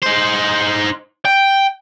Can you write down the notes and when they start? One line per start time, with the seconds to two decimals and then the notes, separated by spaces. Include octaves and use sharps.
0.03 D#4 C5
1.25 G5